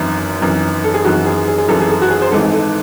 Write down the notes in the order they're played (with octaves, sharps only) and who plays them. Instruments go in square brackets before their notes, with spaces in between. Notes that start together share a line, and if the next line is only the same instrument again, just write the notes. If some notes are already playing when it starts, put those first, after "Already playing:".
Already playing: [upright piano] G#1 F#2 E3 E4
G#1 F#2 E3
A4
G#4
G#1 F#2 E3 F#4
G#4
G#4
G#4
G#1 F#2 E3 A4
G#4
A4
F#4
G#4
C5
G#1 G#2 E3 A4
A4